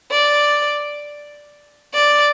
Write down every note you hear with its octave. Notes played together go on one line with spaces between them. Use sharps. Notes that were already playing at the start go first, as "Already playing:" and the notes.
D5
D5